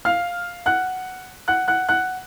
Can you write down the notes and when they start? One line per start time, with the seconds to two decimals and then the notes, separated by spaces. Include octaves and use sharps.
0.05 F5 F6
0.66 F#5 F#6
1.48 F#5 F#6
1.68 F#5 F#6
1.89 F#5 F#6